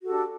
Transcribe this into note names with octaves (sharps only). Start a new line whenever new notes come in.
D4 F#4 G4 A4